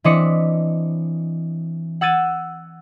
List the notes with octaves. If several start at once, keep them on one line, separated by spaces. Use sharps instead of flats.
E3 C4 D4 D#5 B6 C#7
F#5 E6 G#6 A6 D#7